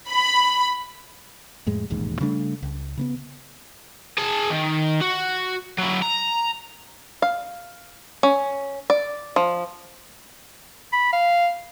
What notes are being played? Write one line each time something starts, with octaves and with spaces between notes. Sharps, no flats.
B5
F2 A2 G#3
E1 A1 D#2 G#2
C#3 G3 A3 D4
C#2
C#3 A#3 B3
G#4 A5
D#3
F#4
F#3 E4
A#5
F5
C#4
D5
F3
B5
F5